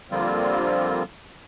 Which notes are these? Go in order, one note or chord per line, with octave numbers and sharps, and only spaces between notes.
D3 F3 G3 A#3 C4 F4